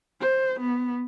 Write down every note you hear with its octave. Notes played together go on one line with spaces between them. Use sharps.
C5
B3